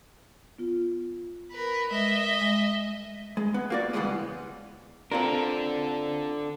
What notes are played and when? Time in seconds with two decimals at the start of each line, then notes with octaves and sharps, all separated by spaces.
0.59 B3 F4
1.52 A#4 B4
1.91 G#3 D#5 E5
2.41 G#3
3.37 G#3
3.54 B3
3.70 A#3 F#4 D5
3.93 C#3 E3 F3 G3 G#3 B3
5.12 C4 D4 F4 A4 A#4